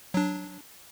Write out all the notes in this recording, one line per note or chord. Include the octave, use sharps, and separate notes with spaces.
F#3 D4